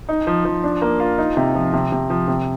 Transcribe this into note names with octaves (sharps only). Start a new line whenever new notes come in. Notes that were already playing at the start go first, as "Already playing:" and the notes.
D#4
F3
F3
D4
A#3
F4
D#4
C3
F3
C3
C3
F3
C3